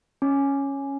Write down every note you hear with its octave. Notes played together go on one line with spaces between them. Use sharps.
C#4